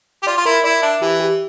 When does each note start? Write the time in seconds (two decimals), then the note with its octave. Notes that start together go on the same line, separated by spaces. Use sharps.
0.23 G4
0.27 F4 D5
0.37 F4
0.45 E4 A#4
0.64 E4 D5
0.82 D4 E5
1.01 E3 G4
1.20 G4